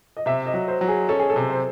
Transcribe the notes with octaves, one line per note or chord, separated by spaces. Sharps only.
D#5
C3 E5
D#5
F#3
C5
F#3
G#4
C#4 A4
G#4
A4
C3
C5